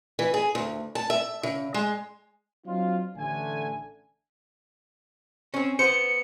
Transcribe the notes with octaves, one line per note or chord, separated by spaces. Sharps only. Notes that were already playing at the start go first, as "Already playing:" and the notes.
E3
G#4
D2
A5
E5
C#3
G#3
F#3 C4 D4 D#4 F4
A1 D3 A3 G#5
C4 C#4
B3 C5 C#7